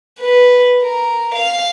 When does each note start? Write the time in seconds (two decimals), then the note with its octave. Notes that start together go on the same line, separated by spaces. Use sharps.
0.20 B4
0.83 A#4
1.35 F5